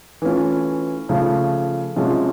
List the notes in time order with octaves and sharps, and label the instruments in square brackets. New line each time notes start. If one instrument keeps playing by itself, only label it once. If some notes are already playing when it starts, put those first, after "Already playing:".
[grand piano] E3 A3 C#4 F4
C#3 F3 A3
C3 F3 G#3 C#4 F#4